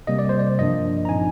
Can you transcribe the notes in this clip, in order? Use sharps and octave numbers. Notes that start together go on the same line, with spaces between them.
C3 G3 A#3 D#5
D5
C5
D5
G2 F3 A#3 D4 D#5
A#5
A#2 F3 C4 D#4 G#5